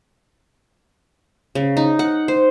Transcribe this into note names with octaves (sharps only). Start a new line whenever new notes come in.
C#3
D#4
F#5
C5